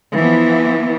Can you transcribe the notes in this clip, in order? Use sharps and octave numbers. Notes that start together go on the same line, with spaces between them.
E3 F3 B3